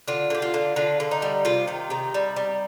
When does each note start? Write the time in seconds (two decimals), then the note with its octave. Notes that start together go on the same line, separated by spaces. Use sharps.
0.08 D3 F4
0.30 D3 G4
0.42 F4
0.54 D3
0.76 D3 F4
1.00 D3
1.11 D#4
1.22 G3
1.45 C3 F4
1.68 D#3 F4
1.90 C3 D#4
2.14 G3
2.36 G3